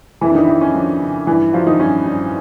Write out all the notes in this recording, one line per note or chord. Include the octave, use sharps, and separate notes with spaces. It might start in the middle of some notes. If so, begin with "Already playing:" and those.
F2 E3 E4
D4
D#3 D#4
E4
D#3 F3 D#4
C#4
F3 D4
C#3
G2 E3 E4
F3 F#3 F4
D#3 D#4
G2 C#4
G2